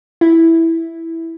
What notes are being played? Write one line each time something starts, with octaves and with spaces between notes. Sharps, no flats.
E4